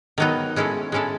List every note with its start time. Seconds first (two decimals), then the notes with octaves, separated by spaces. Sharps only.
0.18 D#3 F#3 B3 D#4
0.56 G#3 C#4 E4 A4
0.92 G#3 C#4 E4 A4